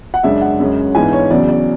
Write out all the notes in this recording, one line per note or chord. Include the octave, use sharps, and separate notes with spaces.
F#5
F#2 C#3 G#3 D4 E5
F#5
F#2 C#3 G#3 C#4
G#2 E3 B3 D4 G#5
C#5
E2 C#3 F#3 D5
D5